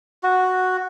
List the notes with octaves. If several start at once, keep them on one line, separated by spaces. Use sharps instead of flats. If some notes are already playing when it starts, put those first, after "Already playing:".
F#4